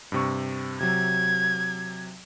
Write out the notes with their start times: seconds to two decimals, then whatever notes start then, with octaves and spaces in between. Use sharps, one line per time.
0.12 G2 C3 C#6
0.81 C3 F#3 G#6